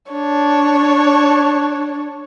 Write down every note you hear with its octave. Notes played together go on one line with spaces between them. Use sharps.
D4 C#5